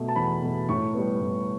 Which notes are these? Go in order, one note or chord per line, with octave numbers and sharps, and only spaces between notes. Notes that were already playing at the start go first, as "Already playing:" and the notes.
Already playing: B2 A3
A5
E2 B5
B2 A3
A2 C#6
G3 B3
A2